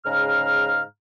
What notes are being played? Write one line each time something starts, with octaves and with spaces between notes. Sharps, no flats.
G#2 C#3 F5 A#5 F6